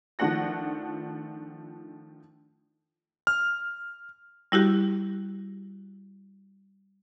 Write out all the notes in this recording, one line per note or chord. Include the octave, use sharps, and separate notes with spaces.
D#3 F3 A3 D4 F#5 A#6
F6
G3 E4 F#4 G4